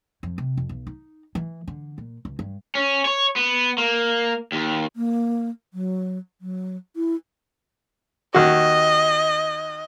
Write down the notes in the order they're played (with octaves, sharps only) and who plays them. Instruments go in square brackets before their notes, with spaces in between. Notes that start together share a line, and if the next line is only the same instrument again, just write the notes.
[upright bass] F2
C3
F2
B1
D#4
E3
D3
A#2
C#2
G2
[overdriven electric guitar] C#4
C#5
B3
A#3
D#2
[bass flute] A#3
F#3
F#3
E4
[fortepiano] D#2 F#4 [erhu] D#5